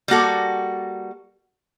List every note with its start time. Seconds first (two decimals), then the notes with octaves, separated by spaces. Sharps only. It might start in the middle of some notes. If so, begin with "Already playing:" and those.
0.08 G3 A#3 F#4 A4